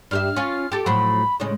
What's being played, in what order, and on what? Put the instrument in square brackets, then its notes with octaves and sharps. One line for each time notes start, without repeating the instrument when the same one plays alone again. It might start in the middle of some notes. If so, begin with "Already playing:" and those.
[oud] G2 G4 E5 [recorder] F6
[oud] C#4 F4
G4 A4
[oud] A2 F3 F#3 [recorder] B5
[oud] A2 C#3 G#3